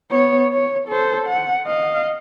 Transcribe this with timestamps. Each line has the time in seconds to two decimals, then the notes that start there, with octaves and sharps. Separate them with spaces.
0.11 B3 C#5
0.53 C#5
0.88 A4 C5
1.27 F#5
1.67 D#5 F5